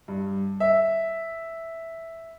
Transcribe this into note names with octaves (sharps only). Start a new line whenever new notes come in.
G2
E5